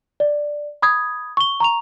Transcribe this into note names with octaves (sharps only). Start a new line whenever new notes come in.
D5
B5 D#6 G#6
C#6 G7
A#5 C#6 F7